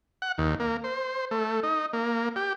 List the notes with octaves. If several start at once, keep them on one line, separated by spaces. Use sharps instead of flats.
F#5
D#2
A#3
C5
A3
D#4
A#3
G4